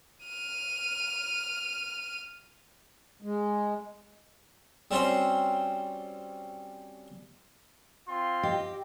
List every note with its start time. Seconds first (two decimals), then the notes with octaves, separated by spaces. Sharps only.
0.24 F6 D#7
3.22 G#3
4.91 G3 C4 C#4 F#4 C5
8.09 C4 F4 C6
8.43 G4 D#5